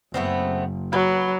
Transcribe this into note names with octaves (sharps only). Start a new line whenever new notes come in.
F#1 A3 B3 C4
F#3 B4